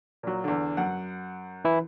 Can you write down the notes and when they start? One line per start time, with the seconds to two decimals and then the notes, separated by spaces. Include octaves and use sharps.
0.23 A#2 F#3
0.44 E2 D3
0.77 F#2 F#5
1.65 E3 E4